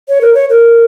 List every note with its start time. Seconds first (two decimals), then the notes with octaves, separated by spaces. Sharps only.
0.09 C#5
0.21 A#4
0.34 C#5
0.49 A#4